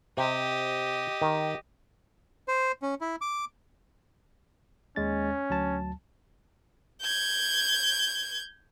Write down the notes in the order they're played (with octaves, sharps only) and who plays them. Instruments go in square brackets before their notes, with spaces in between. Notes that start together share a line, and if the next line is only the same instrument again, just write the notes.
[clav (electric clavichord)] C3 [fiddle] G4 D#5
[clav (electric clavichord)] D#3
[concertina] C5
C#4
E4
D6
[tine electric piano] D#2 G#3 A6 [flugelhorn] C#4
[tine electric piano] D2 F#3 A5
[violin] G6 G#6